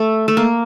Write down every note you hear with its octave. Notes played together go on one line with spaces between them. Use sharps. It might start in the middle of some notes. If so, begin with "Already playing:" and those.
Already playing: A3
A3
A#3